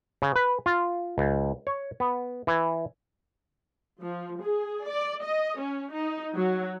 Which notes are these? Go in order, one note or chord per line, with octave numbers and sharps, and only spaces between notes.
C#3
B4
F4
C#2
C#5
B3
E3
F3
G#4
D5
D#5
C#4
D#4
F#3